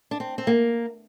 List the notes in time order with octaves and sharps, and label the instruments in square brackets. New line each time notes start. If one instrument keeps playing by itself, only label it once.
[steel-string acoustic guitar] D4
C4
C4
A#3